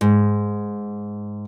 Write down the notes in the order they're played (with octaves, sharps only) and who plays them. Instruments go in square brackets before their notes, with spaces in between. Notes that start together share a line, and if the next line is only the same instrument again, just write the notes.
[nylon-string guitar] G#2